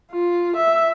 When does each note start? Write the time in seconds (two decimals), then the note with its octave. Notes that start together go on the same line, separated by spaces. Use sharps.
0.12 F4
0.57 E5